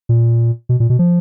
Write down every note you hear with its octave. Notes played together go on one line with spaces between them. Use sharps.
A#2
B2
A#2
B2
F3